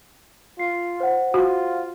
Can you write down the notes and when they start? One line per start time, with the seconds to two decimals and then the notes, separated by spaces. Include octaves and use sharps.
0.59 F4 C7
1.00 C5 F#5
1.34 F4 F#4